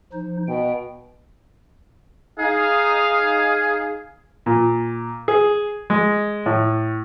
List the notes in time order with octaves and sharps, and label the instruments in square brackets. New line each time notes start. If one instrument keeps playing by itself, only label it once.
[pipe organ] F3 D#4 C5
[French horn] B2 [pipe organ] G5
[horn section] D#4 F5 [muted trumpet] G#4
[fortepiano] A#2
G#4
G#3
A2